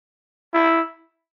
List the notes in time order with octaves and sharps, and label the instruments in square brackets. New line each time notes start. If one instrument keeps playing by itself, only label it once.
[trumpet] E4